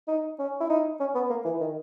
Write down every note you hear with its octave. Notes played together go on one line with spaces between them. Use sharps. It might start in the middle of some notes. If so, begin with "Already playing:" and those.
D#4
C#4
E4
D#4
C#4
B3
A#3
E3
D#3